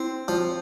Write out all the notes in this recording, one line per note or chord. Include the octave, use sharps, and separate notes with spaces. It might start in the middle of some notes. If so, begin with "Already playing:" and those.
Already playing: C4 E4
F3